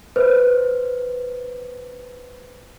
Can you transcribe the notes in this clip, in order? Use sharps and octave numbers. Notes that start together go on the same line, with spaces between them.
B4 C5